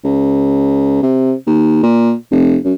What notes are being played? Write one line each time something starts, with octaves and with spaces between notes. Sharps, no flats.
C#2
C3
D#2
A#2
F1
F#2